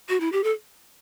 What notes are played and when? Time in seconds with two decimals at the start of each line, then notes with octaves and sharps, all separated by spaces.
0.09 F#4
0.20 E4
0.32 G4
0.44 A4